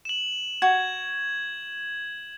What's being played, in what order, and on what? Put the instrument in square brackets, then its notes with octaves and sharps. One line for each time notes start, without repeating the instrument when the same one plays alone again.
[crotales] E7 F#7
[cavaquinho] F#4 [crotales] G#6